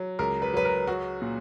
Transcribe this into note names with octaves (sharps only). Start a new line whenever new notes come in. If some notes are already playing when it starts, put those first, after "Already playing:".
Already playing: F#3
C#2 A#4
B4
F#3 B4
A#4
F#3 F#4
A#2